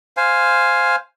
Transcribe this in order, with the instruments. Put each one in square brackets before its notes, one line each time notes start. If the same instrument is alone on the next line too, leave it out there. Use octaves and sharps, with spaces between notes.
[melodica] C5 F5 G#5